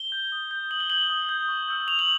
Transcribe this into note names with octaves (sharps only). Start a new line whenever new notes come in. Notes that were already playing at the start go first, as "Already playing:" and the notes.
Already playing: G7
G6
D#6
G6
D#6 F#7
G7
G6 F#7
D#6
G6
C#6
E6 G6
C#6 F7
F#7